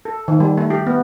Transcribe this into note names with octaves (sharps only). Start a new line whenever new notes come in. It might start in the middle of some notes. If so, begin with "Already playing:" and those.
A4
D#3
G3
A3
G4
B3